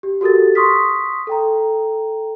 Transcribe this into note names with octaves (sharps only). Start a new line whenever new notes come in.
G4
F#4 G4 A4 A#4 A6
C6 C#6 D#6 F6 B6
A4 G5 A#5